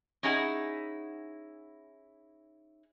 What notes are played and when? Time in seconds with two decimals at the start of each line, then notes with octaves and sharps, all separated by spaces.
0.23 C#4 D#4 E4 G#4 F#5